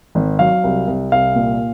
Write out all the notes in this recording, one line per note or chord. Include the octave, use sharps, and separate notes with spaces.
G#1
F#3 F5
C2
C2
C2 F5
A#2